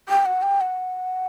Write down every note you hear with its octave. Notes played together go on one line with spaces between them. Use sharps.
G5
F#5
G5
F#5